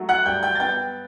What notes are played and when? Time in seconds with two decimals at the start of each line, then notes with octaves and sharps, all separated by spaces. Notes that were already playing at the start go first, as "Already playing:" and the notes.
Already playing: F#3 A3
0.09 F#5 F#6
0.26 G2 G5 G6
0.43 G5 G6
0.55 A6
0.60 B3 G5 G6